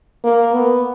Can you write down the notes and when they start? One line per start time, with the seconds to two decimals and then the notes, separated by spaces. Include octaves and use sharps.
0.24 A#3
0.54 B3